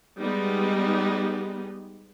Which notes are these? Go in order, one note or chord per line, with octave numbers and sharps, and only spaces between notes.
G3 G#3 B3 D#4